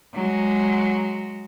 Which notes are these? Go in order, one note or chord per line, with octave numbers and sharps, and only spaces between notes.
F#3 G#3